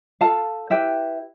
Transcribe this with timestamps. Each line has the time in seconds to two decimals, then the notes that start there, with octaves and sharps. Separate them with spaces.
0.21 F4 A4 F5 A5
0.70 E4 G4 B4 E5 G5